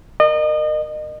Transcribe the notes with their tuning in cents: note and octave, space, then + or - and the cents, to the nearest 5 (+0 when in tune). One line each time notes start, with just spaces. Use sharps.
A#4 +0 D#5 -30